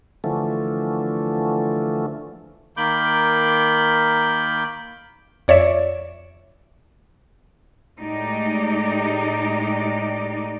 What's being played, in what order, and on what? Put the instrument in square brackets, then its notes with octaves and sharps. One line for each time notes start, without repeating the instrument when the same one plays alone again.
[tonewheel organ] D3 E3 F3 A3
[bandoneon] D#3 A#3 B5 D6 G6
[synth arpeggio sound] F2 C#5 D5 E5
[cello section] A2 G#3 D#4 G4 D5